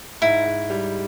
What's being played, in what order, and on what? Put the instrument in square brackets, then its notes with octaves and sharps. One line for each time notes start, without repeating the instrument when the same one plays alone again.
[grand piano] G#2 [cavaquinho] E4
[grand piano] G#2
G3